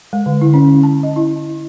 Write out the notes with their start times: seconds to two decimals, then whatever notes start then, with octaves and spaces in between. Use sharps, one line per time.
0.13 G#3
0.26 D3
0.41 E4
0.54 C#4
0.83 A5
1.03 D#5
1.16 E4